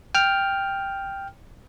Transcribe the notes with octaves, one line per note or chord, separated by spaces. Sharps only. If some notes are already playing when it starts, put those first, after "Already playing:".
G5 F6